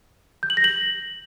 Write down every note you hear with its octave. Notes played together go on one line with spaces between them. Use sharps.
G6
F#7
A#6
F#7